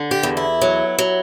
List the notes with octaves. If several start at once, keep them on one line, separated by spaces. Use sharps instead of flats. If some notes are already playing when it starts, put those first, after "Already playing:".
Already playing: D3
G4
E2
E4
F#3
F#3